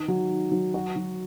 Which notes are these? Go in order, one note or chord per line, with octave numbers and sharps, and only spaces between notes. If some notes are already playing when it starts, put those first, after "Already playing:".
Already playing: D#3
F#3
D#3
F#3
F#4
F#3